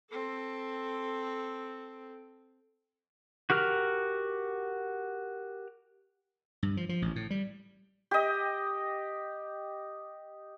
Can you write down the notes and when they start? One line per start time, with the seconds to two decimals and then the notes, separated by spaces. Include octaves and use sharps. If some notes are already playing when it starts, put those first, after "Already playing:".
0.11 C4 A4
3.50 F#4 G4 A#4 F6
6.63 G2
6.77 F3
6.89 F3
7.02 A1
7.16 A2
7.30 G3
8.11 G4 D#5